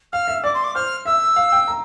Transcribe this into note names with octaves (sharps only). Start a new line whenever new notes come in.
F5 F6
E5
D5 D6
C6
D6
C5 F6
E5 E6
F5
G5
A#5